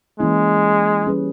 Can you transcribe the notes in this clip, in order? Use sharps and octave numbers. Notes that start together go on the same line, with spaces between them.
E3 G#3 A#3 C#4 E4
G3 C#4 G#4 B4